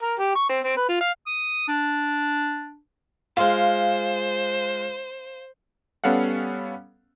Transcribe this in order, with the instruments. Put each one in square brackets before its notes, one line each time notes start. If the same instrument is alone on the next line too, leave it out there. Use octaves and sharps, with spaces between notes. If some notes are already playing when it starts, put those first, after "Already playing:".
[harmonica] A#4
G4
C#6
C4
C4
B4
F4
F5
[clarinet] D#6
D4
[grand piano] G#3 F4 [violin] C5 [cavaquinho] F5 C6
[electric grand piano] G3 B3 C#4 A4 F5 F#5